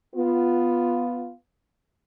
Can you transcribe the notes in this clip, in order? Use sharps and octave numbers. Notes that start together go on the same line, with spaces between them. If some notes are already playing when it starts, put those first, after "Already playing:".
B3 F4